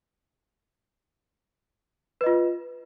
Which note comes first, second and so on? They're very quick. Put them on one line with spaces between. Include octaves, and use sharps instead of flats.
B4 D#5 F4